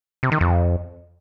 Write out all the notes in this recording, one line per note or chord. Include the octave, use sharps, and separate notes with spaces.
C3
D#3
F2